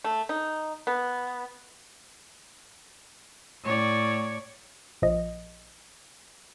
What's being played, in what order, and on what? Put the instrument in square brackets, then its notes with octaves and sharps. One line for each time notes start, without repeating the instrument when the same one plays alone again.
[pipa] A3
D#4
B3
[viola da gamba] A2 C#5 D5
[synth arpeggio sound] A#1 F3 D#5